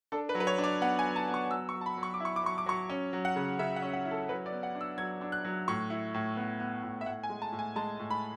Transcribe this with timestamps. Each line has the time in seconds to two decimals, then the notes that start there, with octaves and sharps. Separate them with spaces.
0.12 D4 A4
0.29 B4
0.35 F#3
0.40 B4
0.47 C#5
0.58 D4
0.64 D5
0.81 B3 F#5
0.99 G#5
1.05 F#3
1.16 A5
1.28 B3
1.34 C#6
1.51 F#3 E6
1.69 C#6
1.74 F#3
1.81 A5
1.86 B5
1.97 F#3
2.03 C#6
2.14 D6
2.20 E4 C#6
2.36 D6
2.43 F#3 C#6
2.58 D6
2.66 F#3 C#6
2.90 C#4
3.13 F#3
3.25 F#5
3.36 C#3
3.59 C#3 E5
3.76 F#5
3.82 C#4
3.93 F#5
4.05 E4
4.11 A4
4.29 F#3 B4
4.46 D5
4.52 B3
4.63 F#5
4.75 D4
4.81 E6
4.98 F#3 G#6
5.21 D4
5.32 F#6
5.45 F#3
5.68 A2 C#6
5.90 E4
6.14 A2
6.37 B3
6.60 B3
6.83 A2
7.01 E5
7.06 A2 F#5
7.23 G#5
7.29 G#3
7.42 A5
7.52 A2
7.59 G#5
7.76 G#3 A5
7.99 A2
8.11 B5